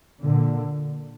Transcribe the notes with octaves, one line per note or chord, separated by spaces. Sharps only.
A#2 D3